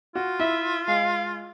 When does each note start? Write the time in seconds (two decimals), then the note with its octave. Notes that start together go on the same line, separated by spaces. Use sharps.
0.16 F4 F#4
0.40 E4 E5
0.88 G#3 F5